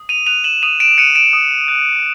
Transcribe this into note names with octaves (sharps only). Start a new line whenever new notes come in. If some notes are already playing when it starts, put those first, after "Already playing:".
Already playing: D#6
D#7 F7
F#6 D#7 F7
E7 F#7
D#6 D#7 F7
D7 E7
F#6 C#7 D#7
D7 E7
D#6
F#6